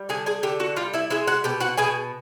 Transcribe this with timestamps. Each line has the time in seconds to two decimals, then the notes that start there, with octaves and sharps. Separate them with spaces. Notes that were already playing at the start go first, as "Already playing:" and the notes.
Already playing: G3
0.09 D3 G#4 G#5
0.26 G#4 G#5
0.43 D3 G4 G5
0.60 F#4 F#5
0.76 G3 F4 F5
0.94 E4 E5
1.10 G#3 E4 E5
1.27 F#4 F#5
1.44 B2 G4 G5
1.60 F#4 F#5
1.78 B2 G#4 G#5